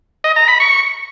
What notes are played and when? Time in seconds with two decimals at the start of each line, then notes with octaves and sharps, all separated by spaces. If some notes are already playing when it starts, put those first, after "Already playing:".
0.24 D#5
0.36 A#5
0.48 B5
0.60 C#6